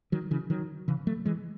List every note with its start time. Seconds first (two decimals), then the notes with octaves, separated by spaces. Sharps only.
0.12 D#3 F#3
0.31 C#3 E3
0.50 D#3 F#3
0.88 C#3 E3
1.07 F#3 A3
1.25 E3 G#3